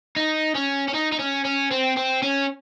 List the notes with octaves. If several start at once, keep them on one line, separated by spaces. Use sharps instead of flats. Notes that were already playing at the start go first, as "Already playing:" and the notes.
D#4
C#4
C#4
D#4
D#4
C#4
C#4
C4
C4
C#4